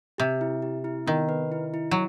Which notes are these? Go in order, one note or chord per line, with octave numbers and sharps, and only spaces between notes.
C3 G4
E4
G4
E4
D#3 B3
B4
E4
E4
F#3